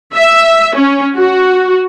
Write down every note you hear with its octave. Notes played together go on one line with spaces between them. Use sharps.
E5
C#4
F#4